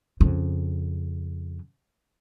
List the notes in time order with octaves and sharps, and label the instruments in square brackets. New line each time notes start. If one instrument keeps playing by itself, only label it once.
[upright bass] F2 C#3